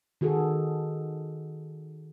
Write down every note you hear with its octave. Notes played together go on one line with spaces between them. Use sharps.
D#3 F#4 G#4 A4